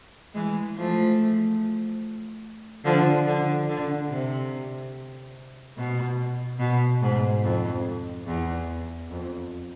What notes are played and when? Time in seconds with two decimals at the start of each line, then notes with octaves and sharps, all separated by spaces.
0.34 E3 G#3
0.77 F3 A3
2.84 D3 F3
3.26 D3
3.68 D3
4.09 C3
5.77 B2
6.59 B2
7.02 G#2
7.43 F2
8.26 E2
9.10 F2